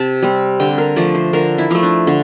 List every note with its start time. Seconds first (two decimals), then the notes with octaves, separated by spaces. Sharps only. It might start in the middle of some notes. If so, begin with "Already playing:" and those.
Already playing: C3 A5
0.22 G3 C4
0.60 D3 G5
0.78 A#4
0.96 F3 A3 D5
1.15 C5
1.33 D3 A#4
1.58 E4
1.71 F3 A3
1.83 D4
2.07 D3